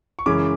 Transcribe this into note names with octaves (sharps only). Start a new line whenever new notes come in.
C#6
F#2 C#3 E3 G#3 C#4 D6